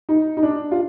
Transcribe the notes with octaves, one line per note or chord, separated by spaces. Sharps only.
D#4
D#4
D4
F4